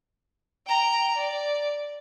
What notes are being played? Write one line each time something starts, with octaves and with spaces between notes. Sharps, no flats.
G5 A#5
D5